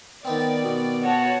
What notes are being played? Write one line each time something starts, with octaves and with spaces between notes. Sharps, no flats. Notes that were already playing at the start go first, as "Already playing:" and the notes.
D#3 B3 C4 D5
B2
F#4 C#5 A5